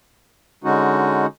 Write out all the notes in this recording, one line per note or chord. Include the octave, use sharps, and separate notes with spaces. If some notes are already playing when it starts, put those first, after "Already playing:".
D3 G#3 C#4 D#4 F#4